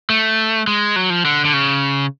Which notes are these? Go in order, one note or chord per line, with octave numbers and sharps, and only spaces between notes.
A3
G#3
F#3
F3
D3
D3
C#3